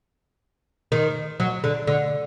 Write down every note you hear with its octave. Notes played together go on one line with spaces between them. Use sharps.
D#3
F#3
D3
D3